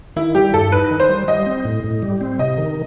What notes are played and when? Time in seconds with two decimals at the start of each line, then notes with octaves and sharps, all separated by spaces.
0.16 D#3 E4
0.35 G3 G4
0.54 G2 A4
0.72 D#4 B4
0.91 D#3
1.00 C5
1.09 G3
1.28 G3 D#5
1.46 C4
1.65 A2
1.84 A2
2.02 G3
2.21 C4
2.39 C3 D#5
2.58 D#3